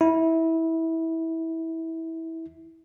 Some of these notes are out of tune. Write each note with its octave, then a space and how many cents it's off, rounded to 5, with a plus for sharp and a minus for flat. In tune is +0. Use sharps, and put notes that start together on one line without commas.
E4 -20